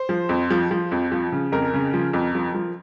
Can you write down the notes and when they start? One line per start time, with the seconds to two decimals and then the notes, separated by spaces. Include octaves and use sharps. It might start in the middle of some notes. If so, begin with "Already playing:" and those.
Already playing: C5
0.09 F3
0.29 F2
0.50 F3
0.71 F3
0.92 F2
1.12 F3
1.32 C#3
1.52 F2 A#4
1.74 C#3
1.94 F3
2.13 F2
2.35 F3
2.55 F3